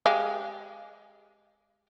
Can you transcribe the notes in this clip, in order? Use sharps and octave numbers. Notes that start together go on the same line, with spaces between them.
G#3 G4 F5